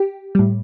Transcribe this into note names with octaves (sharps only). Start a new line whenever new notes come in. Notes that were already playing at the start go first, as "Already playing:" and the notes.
Already playing: G4
A2 G3